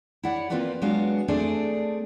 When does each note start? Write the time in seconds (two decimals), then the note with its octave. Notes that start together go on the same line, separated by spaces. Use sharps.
0.23 E4 C#5 D5 F#5
0.50 A#3 C4 F4 G4 B4 D5
0.82 F#3 G#3 B3 D4 F#4 F5
1.28 A3 C4 D4 G#4 A4 D5